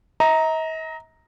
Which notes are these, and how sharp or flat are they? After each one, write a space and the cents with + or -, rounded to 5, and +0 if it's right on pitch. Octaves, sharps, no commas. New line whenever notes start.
D#5 +45 A#5 +0